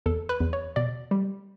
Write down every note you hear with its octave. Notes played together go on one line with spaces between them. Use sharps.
E2 A4
B4
E2
C#5
B2 D5
G3